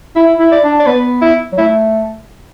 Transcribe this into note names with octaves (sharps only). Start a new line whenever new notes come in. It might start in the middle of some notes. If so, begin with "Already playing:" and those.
E4 E5
E4
D5
D4
D5
B3 B4
E4
F#3
A3 E4